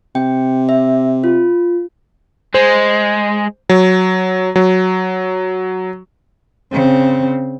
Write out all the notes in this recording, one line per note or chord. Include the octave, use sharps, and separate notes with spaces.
C3 G5
E5
F4
G#3 C5
F#3
F#3
C#3 C4